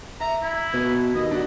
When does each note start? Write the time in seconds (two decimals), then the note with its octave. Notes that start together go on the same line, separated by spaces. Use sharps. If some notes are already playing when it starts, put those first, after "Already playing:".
0.20 E5 A#5
0.43 E4
0.74 B2 B4
1.15 D#2 D#5
1.31 D4 F#4